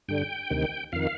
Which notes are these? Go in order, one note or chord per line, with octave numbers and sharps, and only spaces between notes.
G2 D3 G5
D2 C3 D#3
F2 D#3 F5